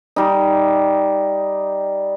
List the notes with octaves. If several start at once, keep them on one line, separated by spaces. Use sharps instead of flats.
G3 D#4